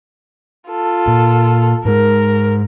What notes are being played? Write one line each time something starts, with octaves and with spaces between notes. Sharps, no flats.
F4 A4
A#2
G#2 G#3 A#4